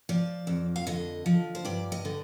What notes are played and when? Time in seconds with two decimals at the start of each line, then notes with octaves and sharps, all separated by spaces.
0.09 F3 D5
0.47 F2
0.76 F5
0.87 D3 D#5
1.26 F3
1.55 C5
1.65 G2 D5
1.92 D#5
2.05 D3